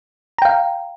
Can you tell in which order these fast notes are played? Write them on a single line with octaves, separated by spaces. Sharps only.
A#5 G5 F5